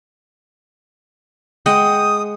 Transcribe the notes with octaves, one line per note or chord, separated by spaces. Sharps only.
G#3 F#5 G5 D#6